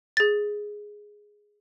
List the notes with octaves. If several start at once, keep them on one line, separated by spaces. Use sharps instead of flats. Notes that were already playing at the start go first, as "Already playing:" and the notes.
G#4 A6